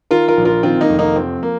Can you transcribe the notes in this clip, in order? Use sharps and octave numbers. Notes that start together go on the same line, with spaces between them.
D#3 F4 A#4
F4 A#4
A#1
F4 A#4
D#3 C4 F4
A#3 D#4
F1
A#3 D#4
F3 C4
A#3